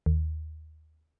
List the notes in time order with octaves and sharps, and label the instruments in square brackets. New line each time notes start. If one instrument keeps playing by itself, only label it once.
[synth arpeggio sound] D#2